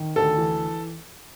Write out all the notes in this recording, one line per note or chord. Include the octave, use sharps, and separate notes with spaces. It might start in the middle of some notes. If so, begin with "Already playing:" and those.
Already playing: D#3
D2 A4
E3